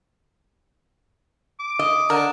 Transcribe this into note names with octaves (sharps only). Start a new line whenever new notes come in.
D6
D#5
D3 A#4